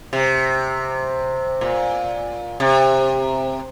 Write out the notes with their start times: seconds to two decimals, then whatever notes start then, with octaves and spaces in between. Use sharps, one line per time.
0.13 C3
1.61 A#2
2.60 C3